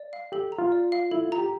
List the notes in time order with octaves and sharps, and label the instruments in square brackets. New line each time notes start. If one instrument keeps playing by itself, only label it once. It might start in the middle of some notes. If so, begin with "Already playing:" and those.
Already playing: [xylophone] D5
F5
[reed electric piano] G4 [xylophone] A4
[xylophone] A#5
[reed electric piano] F4
[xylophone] D5
F5
[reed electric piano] E4 [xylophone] A4
[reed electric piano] F4
[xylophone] A#5
[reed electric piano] G4